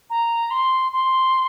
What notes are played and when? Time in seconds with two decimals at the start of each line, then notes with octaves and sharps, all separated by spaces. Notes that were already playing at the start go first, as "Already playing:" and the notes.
0.10 A#5
0.51 C6
0.93 C6